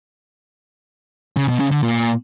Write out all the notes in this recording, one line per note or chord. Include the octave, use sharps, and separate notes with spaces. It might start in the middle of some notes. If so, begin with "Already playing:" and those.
C#3
B2
C#3
D3
A#2